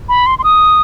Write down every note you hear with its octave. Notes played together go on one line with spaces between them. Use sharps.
B5
C6
C6
D#6